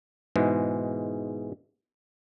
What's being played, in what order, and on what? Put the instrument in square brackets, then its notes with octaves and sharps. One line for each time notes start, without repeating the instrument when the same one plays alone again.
[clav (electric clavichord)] G#2 B2 E3 G#3